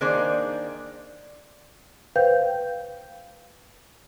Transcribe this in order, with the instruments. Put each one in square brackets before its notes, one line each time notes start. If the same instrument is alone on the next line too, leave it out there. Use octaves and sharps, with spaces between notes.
[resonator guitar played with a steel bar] D#3 A#3 D4 G#4 C5 D5
[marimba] B4 C5 F5 G5 G6